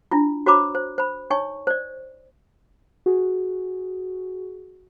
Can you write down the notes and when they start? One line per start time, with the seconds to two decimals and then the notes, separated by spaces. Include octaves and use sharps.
0.11 D4 E4 F4
0.46 F#4 C5 C#5 A#5 B5 D6
0.75 C5
0.98 C5 B5
1.30 D#4 C#5 G#5 C#6
1.67 C5 D5
3.06 F#4 G#4